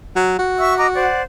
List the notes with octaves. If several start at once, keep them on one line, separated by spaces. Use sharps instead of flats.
F#3
F#4
E5 C#6 E6
D#5 A#5 D6
C5 D5 F#5